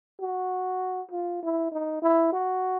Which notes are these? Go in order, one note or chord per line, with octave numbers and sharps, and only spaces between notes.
F#4
F4
E4
D#4
E4
F#4